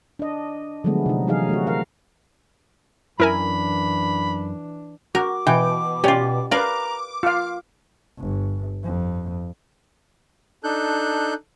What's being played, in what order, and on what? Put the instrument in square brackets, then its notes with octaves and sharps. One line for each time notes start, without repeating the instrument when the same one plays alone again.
[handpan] D4 D#5
D3 F3 F#3 G#3 A3 B3
C3 D#4
E3 F#3 D#4 G#4 F5
A3 F#4
A#4 F5
[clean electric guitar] F#2 [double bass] E3 D4 [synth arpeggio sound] E4 A#4 G#5 [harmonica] B5
[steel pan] F#4 [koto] A#4 [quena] D6
[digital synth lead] B2 [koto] E3 [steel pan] G5
[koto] C#4 F4 [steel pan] G4 D5
[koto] A#4 D5 [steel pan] B4 F5 [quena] A#5 [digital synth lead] D6
[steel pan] F4 F5 [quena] F6
[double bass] G1
F2
[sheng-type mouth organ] D4 D#4 A4 F#6 G6